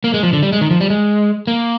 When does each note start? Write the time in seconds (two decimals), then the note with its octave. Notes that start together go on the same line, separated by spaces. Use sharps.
0.04 A#3
0.14 G#3
0.23 F3
0.33 D3
0.43 G3
0.52 G#3
0.61 D#3
0.71 F3
0.81 G3
0.90 G#3
1.47 A#3